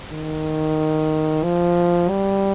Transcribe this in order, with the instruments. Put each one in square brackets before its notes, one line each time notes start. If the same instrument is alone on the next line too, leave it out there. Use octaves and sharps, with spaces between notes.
[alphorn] D#3
F3
G3